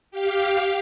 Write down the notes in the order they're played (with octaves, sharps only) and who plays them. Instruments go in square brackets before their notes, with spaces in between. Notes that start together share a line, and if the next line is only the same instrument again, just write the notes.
[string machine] G4 F5